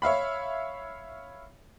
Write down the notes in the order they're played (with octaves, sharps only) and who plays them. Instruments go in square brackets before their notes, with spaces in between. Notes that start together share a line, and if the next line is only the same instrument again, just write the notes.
[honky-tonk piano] C#5 E5 F5 B5